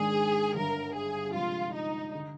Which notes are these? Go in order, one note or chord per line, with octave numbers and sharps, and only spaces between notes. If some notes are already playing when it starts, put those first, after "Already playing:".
Already playing: G#2 D#3 G#3 D4 G#4
G1 G2 D3 A#4
G#4
C3 F3 G#3 F4
D#4
D3